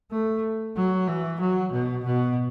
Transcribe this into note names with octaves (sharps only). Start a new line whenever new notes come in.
A3
F#3
E3
F#3
B2
B2